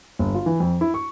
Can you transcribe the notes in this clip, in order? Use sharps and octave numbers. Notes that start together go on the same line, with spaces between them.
G1
F4
E3
F2
E4
C#6